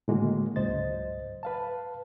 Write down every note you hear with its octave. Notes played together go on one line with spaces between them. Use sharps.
A2 D3 D#3 G#3 A#3 F#4
C#2 G#2 F#3 C5 D#5 A6
B4 F5 A5